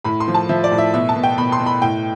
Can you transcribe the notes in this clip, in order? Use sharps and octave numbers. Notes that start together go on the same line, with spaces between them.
A2 B5
C6
F3
A5
F3 E5
D5
A2
E5
B2 E5
A5
B2
G5
B2 B5
C6
B2
B5
A2 G5